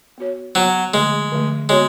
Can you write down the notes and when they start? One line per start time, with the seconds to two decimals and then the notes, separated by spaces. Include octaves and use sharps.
0.18 B3 F#4 C#5
0.55 F#3 B3 F#4 C#5
0.94 D3 F3 G#3 A3
1.32 D3 F3 A3
1.69 G#3 B3 F#4 C#5